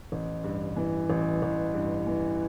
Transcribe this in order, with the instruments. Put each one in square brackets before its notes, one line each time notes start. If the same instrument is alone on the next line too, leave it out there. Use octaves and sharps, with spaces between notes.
[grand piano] A1
G2
E3
A1
A1
G2
E3